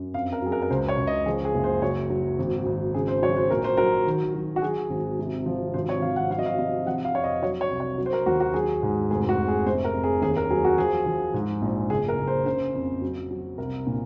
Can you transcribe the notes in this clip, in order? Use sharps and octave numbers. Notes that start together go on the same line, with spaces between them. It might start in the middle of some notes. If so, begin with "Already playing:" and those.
Already playing: F#2
F2 F5
A#4
F#3 G#4
A#4
A#4
C#2 C5
C#5
C#2
D#5
F3 G#4
G#4
F#1
C5
F#3 C#5
F#3
G#1
G#1
C#3 G#4
C5
F#3 C#5
C5
A#1 A#4
C5
F#3 A#4
D#3
F#3
F#4
F#3 G#4
G#1
C3
F3
G#1 C5
C#5
F3 F5
F#5
F#3 F5
D#5
F5
C3 D#5
F3 F#5
F5
F2 C#5
D#5
F#3 C#5
C#5
C2
C#5
F#3
C5
A#4
D#2 F#4
F#4
F#3 G#4
G#2
F1 G#4
F#4
F1
G#4
C3 C5
A#4
F2
G#4
D#2 G#4
A#4
F#3 G#4
F#4
F3 G#4
F3
G#2
A#1
F#1 G#4
A#4
F#1
C5
C#3 C5
F2
F#3
F#3
C2 A#4
A#2